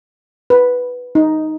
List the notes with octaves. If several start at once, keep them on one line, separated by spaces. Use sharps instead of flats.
B4
D#4